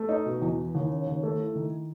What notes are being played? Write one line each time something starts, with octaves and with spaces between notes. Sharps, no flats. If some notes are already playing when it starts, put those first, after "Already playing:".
Already playing: A3
D#4
B2
E2
E3
D#2
C#3
D#2
A3
E4
D#3